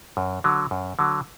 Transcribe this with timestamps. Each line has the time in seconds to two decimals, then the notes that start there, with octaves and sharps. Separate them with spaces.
0.17 F#2
0.44 D3 F#3
0.71 F#2
0.99 D3 F#3